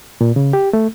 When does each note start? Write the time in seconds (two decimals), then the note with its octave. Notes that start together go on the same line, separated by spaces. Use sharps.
0.21 A#2
0.36 C#3
0.53 G4
0.73 A3